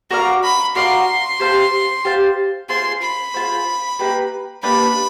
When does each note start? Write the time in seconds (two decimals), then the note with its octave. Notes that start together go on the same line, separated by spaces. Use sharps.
0.11 F#4 A#4 D5 F5 A#5
0.43 B5
0.75 F#4 A#4 D5 F5 C6
1.40 G4 C5 F5 A5
2.05 G4 C5 F5 A5
2.69 F4 G#4 C5 C6
3.02 B5
3.34 F4 G#4 C5
3.99 A#3 D4 G4 B4
4.63 A#3 D4 G4 B4 B5